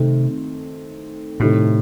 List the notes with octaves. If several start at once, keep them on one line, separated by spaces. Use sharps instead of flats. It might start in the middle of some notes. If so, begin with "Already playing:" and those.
Already playing: C3 D#3 A3 C4
A2 C3 D#3 A3 C4 E4